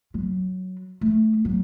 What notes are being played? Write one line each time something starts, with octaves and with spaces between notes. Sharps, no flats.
F#3
A3
F#3